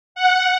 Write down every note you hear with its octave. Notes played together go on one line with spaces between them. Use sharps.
F#5